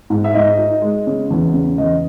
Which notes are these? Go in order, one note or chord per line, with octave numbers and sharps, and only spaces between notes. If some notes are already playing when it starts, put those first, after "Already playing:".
G#2
E5
G#2 D#5
D#4
G#3
C#3
E2
C#3
E2 D#5